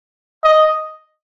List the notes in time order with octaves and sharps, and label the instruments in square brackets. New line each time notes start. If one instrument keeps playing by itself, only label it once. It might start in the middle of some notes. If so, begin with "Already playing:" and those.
[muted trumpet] D#5